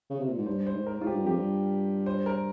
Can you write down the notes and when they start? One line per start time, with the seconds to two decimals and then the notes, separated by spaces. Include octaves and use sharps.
0.10 C#3
0.20 C3
0.29 A#2
0.38 G#2
0.46 G2 C5
0.66 C5
0.74 G#2
0.87 A#4
1.00 G#2 F4
1.07 G4
1.13 G2
1.24 F2 G4
1.36 G2
2.06 C5
2.26 A#4